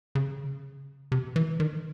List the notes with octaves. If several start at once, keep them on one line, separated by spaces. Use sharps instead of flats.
C#3
C3
E3
D#3